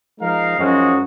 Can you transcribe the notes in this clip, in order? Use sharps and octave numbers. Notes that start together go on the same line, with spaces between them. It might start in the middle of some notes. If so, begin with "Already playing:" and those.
F3 G#3 D#4 A#4 F5
F#2 F3 G#3 D#4 F#4